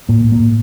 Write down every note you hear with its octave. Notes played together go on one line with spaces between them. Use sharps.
A2 A#3
A2
A#3
A2